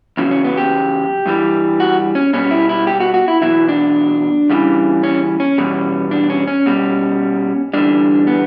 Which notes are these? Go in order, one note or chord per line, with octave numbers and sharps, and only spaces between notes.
E2 C#3 F#3 C#4
C#4
B3
G4
G2 E3 G3
F#4
C#4
B2 G3 C#4
E4
E4
G4
F#4
F#4
E4
E2 B2 F#3 E4
D4
E2 C#3 E3 G3
C#4
C#4
E2 B2 G3
D4
C#4
C#4
B2 G3
E2 D3 G3 D4
B3